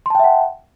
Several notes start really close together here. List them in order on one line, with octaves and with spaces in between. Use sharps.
C6 A5 G5 E5 F#5